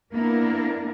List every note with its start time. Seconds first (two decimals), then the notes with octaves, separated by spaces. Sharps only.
0.14 A#3 B3 D4 E4 A#4